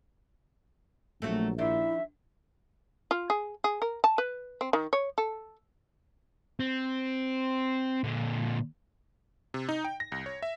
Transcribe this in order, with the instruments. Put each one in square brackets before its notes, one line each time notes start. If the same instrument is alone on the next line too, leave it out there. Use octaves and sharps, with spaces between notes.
[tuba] A#1 [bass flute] F#3 [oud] A3 C4 F#4
[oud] D#3 F3 D4 [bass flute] E4 [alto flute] E5
[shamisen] F4
G#4
G#4
A#4
A5
B4
C4
D#3
C#5
A4
[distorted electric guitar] C4
A#2 D3
[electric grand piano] C3
D#4
G5
A#6
C2
C#5
E5